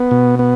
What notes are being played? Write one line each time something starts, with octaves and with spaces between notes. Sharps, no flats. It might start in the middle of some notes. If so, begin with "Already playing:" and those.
Already playing: B3
B2
B3